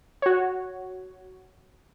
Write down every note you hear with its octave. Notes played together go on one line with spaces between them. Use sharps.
F#4 C#5